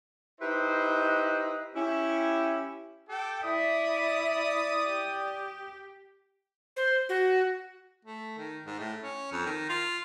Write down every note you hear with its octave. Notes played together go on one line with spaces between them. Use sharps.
D#4 E4 G4 B4 C5 D#5
C#4 E4 G4
G4 A4 G5
E4 D5 E5 D#6
G4
C5
F#4
A3
D#3
G#2
A2
C#4
F2
D#3
F4